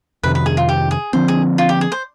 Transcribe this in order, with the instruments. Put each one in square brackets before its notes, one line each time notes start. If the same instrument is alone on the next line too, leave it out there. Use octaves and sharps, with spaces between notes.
[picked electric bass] F2 C3 D#3 [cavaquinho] B4
[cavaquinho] B4
G#4
F4
G4
G#4
[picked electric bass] D3 F3 C4 [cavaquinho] C5
[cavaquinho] G#4
F4
G4
G#4
C5